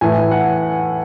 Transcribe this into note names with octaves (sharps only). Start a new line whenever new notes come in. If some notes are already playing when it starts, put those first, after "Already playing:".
A2 E3 A3 G#5
F#5